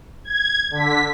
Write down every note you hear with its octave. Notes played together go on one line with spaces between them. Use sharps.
G#6
D3 B6